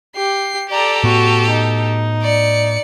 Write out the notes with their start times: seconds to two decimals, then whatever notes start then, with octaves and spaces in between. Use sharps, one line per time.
0.16 G4 C7
0.70 G4 A4 D5 A#5
1.03 A2 B3 F#4
1.51 D#4
2.22 D5 C#7